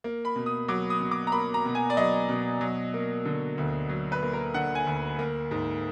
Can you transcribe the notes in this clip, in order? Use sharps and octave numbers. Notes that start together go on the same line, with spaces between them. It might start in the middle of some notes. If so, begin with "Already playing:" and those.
A#3
B5
B2
D#6
F#3 D6
D#6
B2
D6
A#5
A#3 B5
A#5
B2
G#5
D5
F#3 D#5
B2
F#3
A#3
D3
D2
F#3
B4
A#3
A#4
D3 F#5
G#5
D2
A#3
G#2